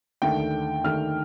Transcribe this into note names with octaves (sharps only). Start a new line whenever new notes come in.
D#2 D3 A3 G5
D#2 D3 A3 F6